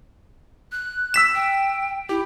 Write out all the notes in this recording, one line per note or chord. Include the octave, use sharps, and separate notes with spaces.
F#6
E6 B6 E7
G5
E4 G4